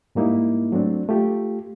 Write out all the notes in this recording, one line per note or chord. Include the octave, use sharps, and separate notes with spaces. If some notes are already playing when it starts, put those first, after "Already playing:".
G#2 G3 A#3 D#4 E4
F#3 A3 C4 D4
A3 F4 G4